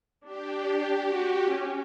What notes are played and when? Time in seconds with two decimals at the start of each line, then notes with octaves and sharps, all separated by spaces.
0.25 D4 G4
1.11 F#4
1.50 C#4